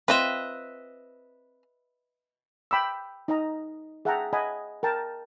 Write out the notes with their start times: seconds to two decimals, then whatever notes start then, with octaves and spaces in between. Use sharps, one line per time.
0.08 C4 F4 B4 D#5 E5
2.71 G5 B5 D6 E6
3.28 D#4 D#5 A#5
4.05 G#4 E5 F#5 G5 A5 A#5
4.33 D#5 F#5 G#5 B5
4.83 A#4 G5 A5